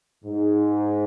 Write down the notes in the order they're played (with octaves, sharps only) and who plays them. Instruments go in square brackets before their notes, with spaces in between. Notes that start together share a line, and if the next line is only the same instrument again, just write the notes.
[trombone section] G#2